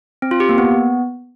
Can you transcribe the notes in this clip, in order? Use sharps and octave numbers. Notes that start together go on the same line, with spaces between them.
C4
F4
G4
A#3
B3